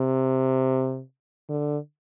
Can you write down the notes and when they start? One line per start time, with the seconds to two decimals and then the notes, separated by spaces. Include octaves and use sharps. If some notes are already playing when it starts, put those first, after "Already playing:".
Already playing: C3
1.49 D3